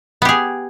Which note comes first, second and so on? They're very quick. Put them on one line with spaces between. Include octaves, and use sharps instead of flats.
B3 G4 G#4